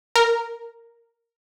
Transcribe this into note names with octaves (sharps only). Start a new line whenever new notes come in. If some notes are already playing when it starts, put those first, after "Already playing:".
A#4